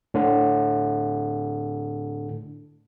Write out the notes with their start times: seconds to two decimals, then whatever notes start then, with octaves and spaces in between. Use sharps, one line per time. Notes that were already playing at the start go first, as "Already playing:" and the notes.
0.14 A2 D3